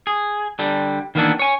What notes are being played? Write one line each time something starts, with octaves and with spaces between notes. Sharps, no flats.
G#4
D3 G3
D#3 E3 A#3 B3 D4 E4
C#5 G#5